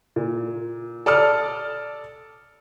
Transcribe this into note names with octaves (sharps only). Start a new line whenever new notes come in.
A#2
A4 D5 A5 D#6 F6